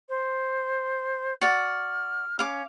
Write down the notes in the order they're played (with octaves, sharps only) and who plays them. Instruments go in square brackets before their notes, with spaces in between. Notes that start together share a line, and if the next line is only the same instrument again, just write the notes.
[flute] C5
[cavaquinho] F#4 D5 [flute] F6
[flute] C#4 [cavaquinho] F5 D6